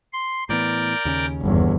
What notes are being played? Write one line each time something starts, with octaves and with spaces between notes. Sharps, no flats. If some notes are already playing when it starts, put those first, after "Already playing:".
C6
A2 E3 B3 A#4 D5 G5
D#2 C#3 C#4
G1 E2